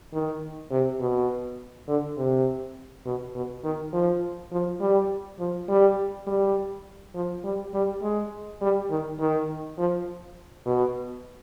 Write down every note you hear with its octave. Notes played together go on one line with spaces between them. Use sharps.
D#3
C3
B2
D3
C3
B2
B2
D#3
F3
F3
G3
F3
G3
G3
F3
G3
G3
G#3
G3
D#3
D#3
F3
B2